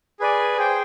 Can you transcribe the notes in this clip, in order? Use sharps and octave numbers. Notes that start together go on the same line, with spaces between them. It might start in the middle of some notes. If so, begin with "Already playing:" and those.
G#4 B4 D5 G#5
G#4 C5 G5